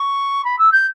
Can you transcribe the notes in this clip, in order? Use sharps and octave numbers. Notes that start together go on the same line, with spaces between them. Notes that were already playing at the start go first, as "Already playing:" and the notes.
Already playing: C#6
B5
E6
G6